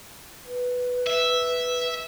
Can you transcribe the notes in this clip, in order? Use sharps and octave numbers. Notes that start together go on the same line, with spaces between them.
B4
E5